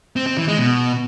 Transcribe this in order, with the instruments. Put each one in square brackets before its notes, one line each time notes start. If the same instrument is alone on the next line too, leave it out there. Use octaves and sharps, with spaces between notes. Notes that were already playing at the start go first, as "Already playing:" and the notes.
[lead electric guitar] C4
C4
E3
G#3
B2